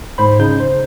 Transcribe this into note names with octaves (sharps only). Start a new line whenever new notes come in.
G#2 C5 B5
C#3 D#4 G6
C5